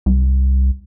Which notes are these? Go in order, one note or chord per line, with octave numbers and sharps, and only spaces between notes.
C2